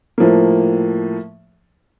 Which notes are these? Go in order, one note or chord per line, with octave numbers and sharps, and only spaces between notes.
A2 F3 A#3